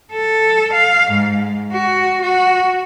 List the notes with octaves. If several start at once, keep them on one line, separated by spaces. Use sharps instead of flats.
A4
F5
G#2
F#4
F#4